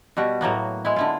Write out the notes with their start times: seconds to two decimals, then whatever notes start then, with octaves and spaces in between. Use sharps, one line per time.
0.17 B2 G3 F#4
0.41 A2 F#3 A#3 B3
0.85 G#3 E4
0.96 D3 E4 F4